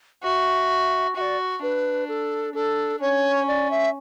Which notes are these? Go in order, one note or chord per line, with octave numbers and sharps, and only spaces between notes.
F#4 E5
F#4 D5 E5
D4 B4
A4
D4 A4
C#4 C#5
D5
E5